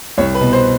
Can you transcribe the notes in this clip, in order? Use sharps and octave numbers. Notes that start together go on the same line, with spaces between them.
C2 C#5
B4
B2
C5